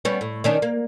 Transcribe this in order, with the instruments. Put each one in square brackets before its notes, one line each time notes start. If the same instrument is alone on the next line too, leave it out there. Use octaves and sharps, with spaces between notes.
[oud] G3 B3 C#4
A2
D#3 C#4 D4
A#3